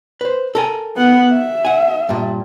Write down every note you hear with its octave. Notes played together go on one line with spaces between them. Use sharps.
B4 C5
A4 A#4 G#5
B3 F#5
E5
F#5 G#5
G2 A#2